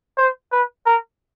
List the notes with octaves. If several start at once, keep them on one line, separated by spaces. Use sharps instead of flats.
C5
B4
A#4